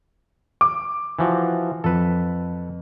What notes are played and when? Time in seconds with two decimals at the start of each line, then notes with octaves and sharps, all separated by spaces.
0.61 D6
1.19 E3 F3 F#4
1.84 F2 A4 B4